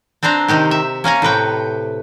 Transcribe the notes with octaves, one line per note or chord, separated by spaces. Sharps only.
C4 D4 B4 C5 A#5
C3 D#3 D#4 G4
E5
A#3 C#4 G#5 A#5
A2 C3 B4 G5